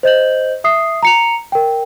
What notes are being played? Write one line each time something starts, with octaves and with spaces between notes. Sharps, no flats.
C5 D#5 G6 F#7
E5 D#6 C7
A#5 C#7 F7
A#4 G5